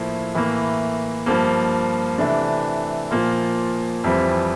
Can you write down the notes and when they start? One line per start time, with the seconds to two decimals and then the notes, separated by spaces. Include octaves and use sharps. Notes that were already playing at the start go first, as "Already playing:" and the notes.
Already playing: A2 F3 A#3 E4
0.34 A2 E3 A#3
1.26 G2 F3 A#3
2.18 C3 E3 A3 D4
3.11 A#2 F3 A#3 F4
4.04 F2 E3 G3 C4